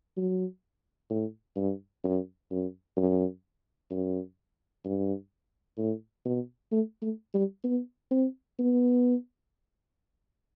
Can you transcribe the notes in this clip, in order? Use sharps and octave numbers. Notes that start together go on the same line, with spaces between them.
F#3
A2
G2
F#2
F#2
F#2
F#2
G2
A2
B2
A3
A3
G3
B3
C4
B3